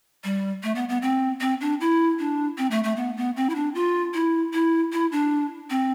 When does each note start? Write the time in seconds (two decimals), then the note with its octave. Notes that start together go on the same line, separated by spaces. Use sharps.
0.24 G3
0.63 A3
0.75 B3
0.89 B3
1.02 C4
1.40 C4
1.61 D4
1.81 E4
2.19 D4
2.58 C4
2.71 A3
2.84 A3
2.97 B3
3.17 B3
3.36 C4
3.50 E4
3.55 D4
3.75 F4
4.14 E4
4.53 E4
4.92 E4
5.12 D4
5.70 C4